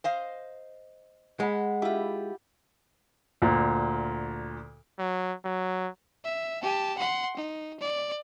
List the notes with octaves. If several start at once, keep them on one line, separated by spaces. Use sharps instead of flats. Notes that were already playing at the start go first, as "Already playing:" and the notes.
C5 D#5 F5
G#3 F#5 B5
E4 F4 G4
D2 A#2
F#3
F#3
E5
G4 A5
F#5 C6
D#4
D5